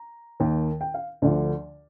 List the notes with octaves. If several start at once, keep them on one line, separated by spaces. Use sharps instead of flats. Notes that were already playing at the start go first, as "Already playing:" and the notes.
Already playing: A#5
D#2 D#3
G5
F5
D2 D3 F3 D5